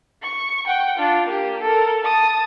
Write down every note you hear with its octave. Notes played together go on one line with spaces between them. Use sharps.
C#6
F#5 G5
D4 F4
A#3 G4
A4 A#4
A5 D#6